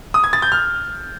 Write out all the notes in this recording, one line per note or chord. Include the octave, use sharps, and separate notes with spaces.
D#6
G#6
A6
G6
F6